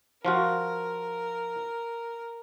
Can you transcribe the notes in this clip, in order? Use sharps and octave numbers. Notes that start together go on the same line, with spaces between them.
F3 F4 F#4 A#4